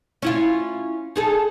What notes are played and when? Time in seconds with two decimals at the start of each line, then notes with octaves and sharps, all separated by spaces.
0.22 C#4 E4 F4
1.16 D#4 G#4 A4